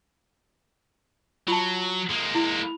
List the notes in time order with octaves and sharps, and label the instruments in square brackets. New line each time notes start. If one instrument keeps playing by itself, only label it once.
[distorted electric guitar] F#3 [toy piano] F4 A5
[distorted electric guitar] G#3 A#3
[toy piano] E4
B5